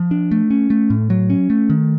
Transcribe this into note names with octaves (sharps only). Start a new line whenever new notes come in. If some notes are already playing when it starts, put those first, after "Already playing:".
Already playing: F3
D4
A3
C#4
A3
A2
F#3
C#4
A3
D#3